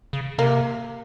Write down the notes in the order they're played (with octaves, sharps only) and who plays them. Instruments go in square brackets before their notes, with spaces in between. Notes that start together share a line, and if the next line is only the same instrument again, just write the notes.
[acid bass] C#3
[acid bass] C3 [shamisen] A#3